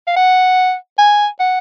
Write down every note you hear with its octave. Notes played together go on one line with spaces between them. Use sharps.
F5
F#5
G#5
F#5